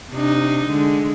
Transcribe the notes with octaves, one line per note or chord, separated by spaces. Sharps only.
C3 D4 D#4
D3 G#3